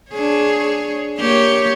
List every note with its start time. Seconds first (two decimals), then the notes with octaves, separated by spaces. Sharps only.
0.12 D4 G#4 C#5
1.18 A#3 G4 C#5